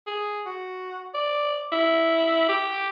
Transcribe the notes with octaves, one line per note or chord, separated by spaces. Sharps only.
G#4
F#4
D5
E4
G4